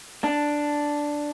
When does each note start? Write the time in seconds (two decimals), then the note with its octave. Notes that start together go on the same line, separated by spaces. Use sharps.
0.24 D4